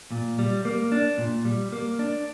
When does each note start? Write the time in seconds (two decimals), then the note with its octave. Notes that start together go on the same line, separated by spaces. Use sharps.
0.11 A#2
0.39 G3
0.65 A#3
0.92 D4
1.18 A#2
1.45 G3
1.72 A#3
1.99 D4